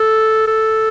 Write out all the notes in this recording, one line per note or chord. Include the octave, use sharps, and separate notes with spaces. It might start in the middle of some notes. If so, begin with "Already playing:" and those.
Already playing: A4
A4